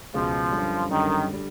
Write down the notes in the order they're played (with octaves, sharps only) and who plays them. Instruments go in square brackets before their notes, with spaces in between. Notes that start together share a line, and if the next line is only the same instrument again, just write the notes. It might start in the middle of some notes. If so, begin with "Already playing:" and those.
[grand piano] C#2 B2 G#3 [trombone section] F3
[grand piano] F#2 D3 G3
[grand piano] F#2 D3 G3 [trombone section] D#3
[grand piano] D3 G3